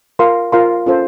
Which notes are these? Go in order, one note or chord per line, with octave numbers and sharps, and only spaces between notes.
F4 A#4 F5 C6
F4 A#4 F5 C6
C#4 F4 A4 C5